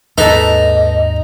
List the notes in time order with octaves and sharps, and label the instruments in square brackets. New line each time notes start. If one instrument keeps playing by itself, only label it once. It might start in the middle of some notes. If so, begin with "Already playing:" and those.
[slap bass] D#2 G#2 [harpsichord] D#4 [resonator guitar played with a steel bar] A4 B4 [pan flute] D#5